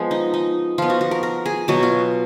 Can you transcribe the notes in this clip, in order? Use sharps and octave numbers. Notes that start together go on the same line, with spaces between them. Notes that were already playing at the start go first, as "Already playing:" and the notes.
Already playing: F3 G#3 B3
D#4
D#4
F3 B3 F4
F#4
F#4
A#4
A#4
G#4
B2 F#3 B3 F#4
F4